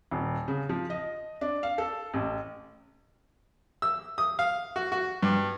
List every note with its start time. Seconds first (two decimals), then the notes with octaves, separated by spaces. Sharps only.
0.11 D#1
0.48 C#3
0.69 F3
0.90 D#5
1.41 D4
1.63 F5
1.78 A4
2.14 A1
3.82 E6
4.18 D#6
4.39 F5
4.76 F#4
4.92 F#4
5.23 G2